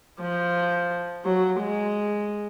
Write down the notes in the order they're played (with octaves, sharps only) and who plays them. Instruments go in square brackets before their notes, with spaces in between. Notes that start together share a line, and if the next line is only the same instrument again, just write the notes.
[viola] F3
F#3
G#3